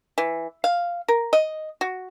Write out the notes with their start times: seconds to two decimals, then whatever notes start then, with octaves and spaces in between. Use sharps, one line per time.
0.18 E3
0.64 F5
1.08 A#4
1.33 D#5
1.81 F#4